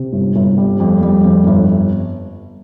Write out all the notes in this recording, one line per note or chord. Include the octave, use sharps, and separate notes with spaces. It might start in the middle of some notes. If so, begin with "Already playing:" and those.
Already playing: C3
G1
G1
G3
F2
G3
F2
G1